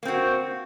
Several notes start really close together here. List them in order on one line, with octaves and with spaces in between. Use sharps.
A#3 C4 F#4